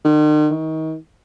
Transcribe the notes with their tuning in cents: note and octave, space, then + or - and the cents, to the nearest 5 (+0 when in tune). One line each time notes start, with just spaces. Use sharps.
D#3 -45
D#3 +30